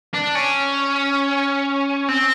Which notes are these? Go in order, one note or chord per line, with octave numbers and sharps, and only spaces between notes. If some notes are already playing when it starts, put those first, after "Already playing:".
D4
C#4
C4